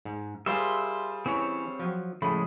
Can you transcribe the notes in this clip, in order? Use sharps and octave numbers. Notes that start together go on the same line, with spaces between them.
G#2
G3 F4 G4 G#4 A#4 C5 E5 C6
E3 C4 C#4 E4 C#5
F3 F#3
A2 C#3 F3 G#3 A3 B5